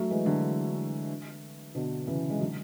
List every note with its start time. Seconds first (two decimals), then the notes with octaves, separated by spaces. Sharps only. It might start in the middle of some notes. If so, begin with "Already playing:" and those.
Already playing: F#3 A3
0.10 E3 G#3
0.26 D3 F#3
1.75 B2 D3
2.07 C#3 E3
2.30 G#3
2.40 D3 F#3